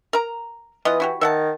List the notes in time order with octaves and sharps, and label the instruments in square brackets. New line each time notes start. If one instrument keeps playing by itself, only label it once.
[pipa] A#4 A#5
[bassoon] E3 [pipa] B3 F4 D#5
[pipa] E4 F#4 G4
[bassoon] D#3 [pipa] E5 F#5 A5